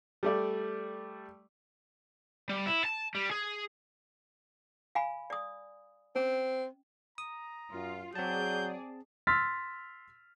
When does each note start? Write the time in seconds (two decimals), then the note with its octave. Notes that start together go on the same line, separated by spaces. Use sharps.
0.23 G3 A3 D5
2.50 G3
2.67 E4
2.85 A5
3.15 G3
3.31 G#4
4.95 F5 G#5 B5
5.30 D5 D#6
6.16 C4 C#4
7.18 A#5 D#6
7.73 F#2 F4
8.15 F#3 C4 G#4 D5 A5 G6
9.27 C6 E6 F6 A6 B6